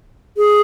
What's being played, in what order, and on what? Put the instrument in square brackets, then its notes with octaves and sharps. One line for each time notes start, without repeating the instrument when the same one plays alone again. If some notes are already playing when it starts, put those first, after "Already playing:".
[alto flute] G#4